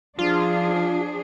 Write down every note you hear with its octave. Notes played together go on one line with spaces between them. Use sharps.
F3 D4 F4 G#4